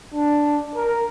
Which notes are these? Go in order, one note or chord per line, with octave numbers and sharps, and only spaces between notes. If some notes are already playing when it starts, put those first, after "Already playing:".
D4
A#4